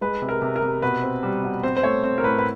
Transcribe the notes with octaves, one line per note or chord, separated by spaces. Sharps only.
G#3 B4
C3
A#4
C3
A#4
C3
B2 B4
C4
G3
B2
C4 C5
C5
A3 C#5
C4 C5
A#4
A2 B4
B4